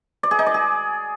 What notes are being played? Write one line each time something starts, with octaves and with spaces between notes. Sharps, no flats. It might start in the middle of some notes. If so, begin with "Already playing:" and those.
D5
G#4
D#4
D5
G#4